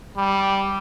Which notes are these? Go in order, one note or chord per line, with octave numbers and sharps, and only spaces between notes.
G3